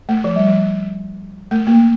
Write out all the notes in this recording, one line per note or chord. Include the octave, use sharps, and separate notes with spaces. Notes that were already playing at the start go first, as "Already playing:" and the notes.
A3
F3
G3
F3
A3
A#3